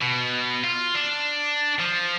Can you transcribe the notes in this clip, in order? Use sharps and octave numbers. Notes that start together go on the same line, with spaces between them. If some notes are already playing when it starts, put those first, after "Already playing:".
B2
F4
D4
F3